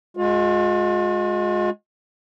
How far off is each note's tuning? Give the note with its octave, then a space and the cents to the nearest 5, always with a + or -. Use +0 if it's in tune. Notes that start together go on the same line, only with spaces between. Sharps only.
G#3 +5 F4 +45